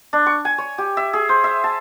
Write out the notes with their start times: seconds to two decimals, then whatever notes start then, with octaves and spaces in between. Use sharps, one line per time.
0.13 D4
0.26 C#6
0.45 G#5
0.58 C#5
0.78 G4
0.97 E5
1.13 G#4
1.29 C5
1.44 E5
1.64 A5